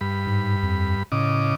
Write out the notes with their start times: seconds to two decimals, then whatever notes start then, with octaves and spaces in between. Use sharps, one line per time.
0.01 G2 B5
0.27 G#2
0.63 F2
1.12 A2 C#3 D#5 D6